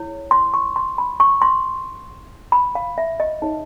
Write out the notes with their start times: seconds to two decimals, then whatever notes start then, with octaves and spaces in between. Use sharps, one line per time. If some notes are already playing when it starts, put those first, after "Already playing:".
Already playing: E4 G#4 C#5
0.31 C6
0.54 C#6
0.76 C6
0.98 B5
1.20 C#6
1.42 C6
2.52 B5
2.75 F5
2.98 E5
3.20 D#5
3.42 D#4 G#4 C#5